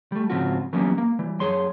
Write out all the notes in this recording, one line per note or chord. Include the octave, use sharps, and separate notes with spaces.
G3 A3
G#2 C#3 F3 C4 F4 F#4
E3 F#3 G3 A#3 B3 C#4
A#3
E3 G3
F#2 G#4 C#5 C6